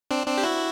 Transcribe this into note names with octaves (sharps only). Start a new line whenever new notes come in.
C4 D4
C4 D4
G4
E4 F#4